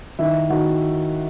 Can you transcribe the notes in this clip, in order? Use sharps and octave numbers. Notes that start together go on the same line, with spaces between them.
D#3 E4 E5
D#3 F#4 F#5